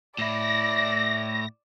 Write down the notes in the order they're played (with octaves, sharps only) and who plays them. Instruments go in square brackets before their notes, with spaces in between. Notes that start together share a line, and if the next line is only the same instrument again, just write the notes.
[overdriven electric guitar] A2 E4 [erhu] D5 [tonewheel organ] A#6